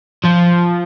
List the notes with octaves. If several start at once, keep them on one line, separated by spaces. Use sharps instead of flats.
F3